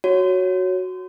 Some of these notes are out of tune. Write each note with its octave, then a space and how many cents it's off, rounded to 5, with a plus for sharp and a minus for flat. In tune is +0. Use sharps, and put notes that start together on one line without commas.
F#4 +0 C#5 +0